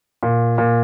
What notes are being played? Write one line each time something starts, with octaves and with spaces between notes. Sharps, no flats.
A#2
A#2